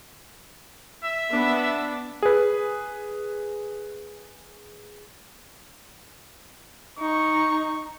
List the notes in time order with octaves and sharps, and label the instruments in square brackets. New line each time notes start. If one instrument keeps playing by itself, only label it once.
[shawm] E5
[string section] B3 [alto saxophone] D4
[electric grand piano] G#4 B4
[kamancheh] D#4 [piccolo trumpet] C#6